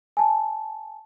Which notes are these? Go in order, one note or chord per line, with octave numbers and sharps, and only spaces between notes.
G#5 A5